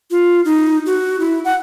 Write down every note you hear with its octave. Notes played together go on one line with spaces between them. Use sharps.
F4
D#4
F#4
E4
F#5